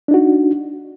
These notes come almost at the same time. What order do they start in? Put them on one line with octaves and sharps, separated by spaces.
D4 D#4 F#4